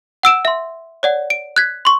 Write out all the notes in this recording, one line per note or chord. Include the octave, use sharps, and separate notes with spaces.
F#5 E6 D7 E7
E5 C6
C#5 D5 F#5
D7
F#6 G#6 B6
C6 C#6